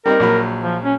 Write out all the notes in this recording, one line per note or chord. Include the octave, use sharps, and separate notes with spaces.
G3 C4 D#4 A#4
A#1 F#3 B5
F3
C#4